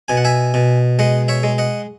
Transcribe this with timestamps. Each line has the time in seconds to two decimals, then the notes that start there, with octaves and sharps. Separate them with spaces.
0.08 B2 G#5
0.17 F#5
0.25 E5 G#5
0.54 B2
0.99 G#3 D#5 F#5
1.28 C#5 E5
1.43 G#3
1.58 D#5 F#5